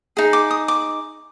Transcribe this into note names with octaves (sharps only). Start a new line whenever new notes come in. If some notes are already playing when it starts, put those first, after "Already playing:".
D#4 G#4
D6
D#6
D6